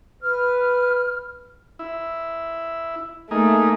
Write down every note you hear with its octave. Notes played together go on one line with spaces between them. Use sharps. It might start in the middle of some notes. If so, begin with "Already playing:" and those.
B4 F6
E4
A3 A#3 D#4 G#4